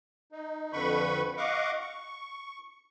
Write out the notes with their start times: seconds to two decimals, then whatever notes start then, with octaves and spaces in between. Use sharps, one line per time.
0.32 D#4
0.73 F2 D3 B4 B5 C#6
1.37 D#5 F5 F#5 C#6 D6
1.80 C#6